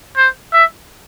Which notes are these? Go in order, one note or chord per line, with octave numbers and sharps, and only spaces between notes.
C5
E5